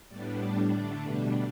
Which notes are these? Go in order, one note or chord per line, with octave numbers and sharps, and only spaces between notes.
A2 G3 B3 D4 D5
A2 G3 D4 D5
D3 A3 D4 D5
B2 G3 D4 B4